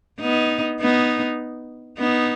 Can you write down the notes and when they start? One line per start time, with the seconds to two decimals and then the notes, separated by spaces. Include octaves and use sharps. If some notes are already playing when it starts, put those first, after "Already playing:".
0.20 B3 D#4
0.81 B3 D#4
1.99 B3 D#4